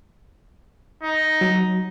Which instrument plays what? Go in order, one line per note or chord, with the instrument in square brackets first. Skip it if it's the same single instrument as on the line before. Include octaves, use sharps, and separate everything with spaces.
[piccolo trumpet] D#4
[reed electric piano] F#3